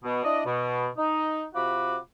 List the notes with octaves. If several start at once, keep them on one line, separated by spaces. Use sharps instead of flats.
B2
D4 E4 D5 D#5
B2
D#4
C3 F4 F#4 B5 D6